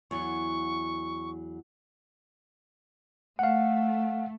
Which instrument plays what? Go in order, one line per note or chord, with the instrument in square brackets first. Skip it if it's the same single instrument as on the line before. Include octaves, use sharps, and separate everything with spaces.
[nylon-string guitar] E2 F#3 [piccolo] C#6
[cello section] A3 [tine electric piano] F5 F#5